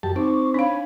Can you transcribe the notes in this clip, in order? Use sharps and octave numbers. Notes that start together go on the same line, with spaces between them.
F#2 G4 A5
C4 D#4 C#6 D6
D4 C#5 F5 G#5 B5